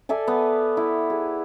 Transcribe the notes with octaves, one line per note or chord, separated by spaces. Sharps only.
A4 D5 E5 G#5
B3
E4
G#4